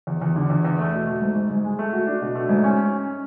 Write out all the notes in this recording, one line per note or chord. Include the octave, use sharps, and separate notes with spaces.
E2
E2
D3
E2
E2
A3
B2
A3
G#2
G#2
G#2
G#3
A3
F#4
D4
B2
A3
G#2
C#4
C#4